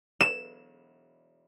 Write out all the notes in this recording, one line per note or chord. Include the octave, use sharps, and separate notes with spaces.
E7